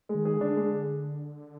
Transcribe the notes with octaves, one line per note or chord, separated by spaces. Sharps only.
G#3
D#3
G#4
D3
D4
G#3